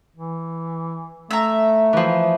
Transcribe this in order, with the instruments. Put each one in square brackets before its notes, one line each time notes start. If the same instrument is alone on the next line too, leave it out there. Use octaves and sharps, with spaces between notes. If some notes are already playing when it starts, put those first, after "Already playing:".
[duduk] E3
[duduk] A3 [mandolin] E5 A#5
[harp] E3 F3